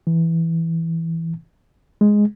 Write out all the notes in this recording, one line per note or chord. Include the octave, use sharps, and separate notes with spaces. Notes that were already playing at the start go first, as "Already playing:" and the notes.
E3
G#3